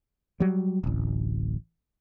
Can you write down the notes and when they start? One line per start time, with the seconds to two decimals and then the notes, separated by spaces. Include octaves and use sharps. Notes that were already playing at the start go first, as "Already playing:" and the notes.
0.40 F#3 G3
0.84 D1 A1